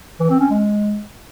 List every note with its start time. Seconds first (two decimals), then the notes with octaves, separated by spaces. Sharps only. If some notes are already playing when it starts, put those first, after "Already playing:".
0.20 E3
0.30 C4
0.40 C#4
0.50 G#3